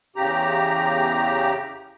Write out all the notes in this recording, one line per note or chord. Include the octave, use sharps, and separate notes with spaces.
E2 C#3 G4 A#5